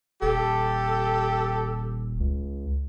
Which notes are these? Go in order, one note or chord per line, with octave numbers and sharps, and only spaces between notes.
D#1 G4 A4
C#2